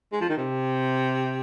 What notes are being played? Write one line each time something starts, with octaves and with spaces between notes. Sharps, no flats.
G#3
F3
D#3
C3